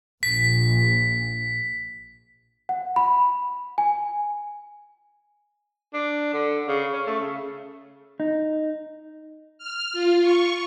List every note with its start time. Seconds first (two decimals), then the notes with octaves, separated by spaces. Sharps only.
0.23 A#1 B6
2.69 F#5
2.96 B5
3.78 G#5
5.94 D4
6.34 D3
6.68 C#3
6.93 C#4
7.07 A3
7.20 C#3
8.20 D#4
9.58 F6
9.92 F4
10.22 C#6